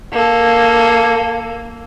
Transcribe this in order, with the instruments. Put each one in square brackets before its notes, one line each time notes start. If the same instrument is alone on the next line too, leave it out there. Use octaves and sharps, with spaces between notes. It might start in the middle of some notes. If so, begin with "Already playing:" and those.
[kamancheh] A#3 A4